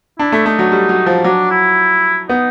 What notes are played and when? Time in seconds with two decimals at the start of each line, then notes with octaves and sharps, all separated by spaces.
0.19 D4 E4
0.32 A3
0.45 A3 D#4
0.59 F#3
0.72 G3
0.89 F#3
1.06 F3
1.24 F#3 D4
1.51 E4
2.29 B3 D#4